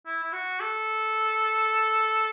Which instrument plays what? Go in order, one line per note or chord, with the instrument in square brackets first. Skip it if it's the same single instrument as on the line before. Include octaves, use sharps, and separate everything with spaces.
[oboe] E4
E4
F#4
A4